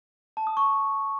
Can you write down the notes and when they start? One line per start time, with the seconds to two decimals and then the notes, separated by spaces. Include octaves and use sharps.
0.37 A5
0.47 D#6
0.57 C#6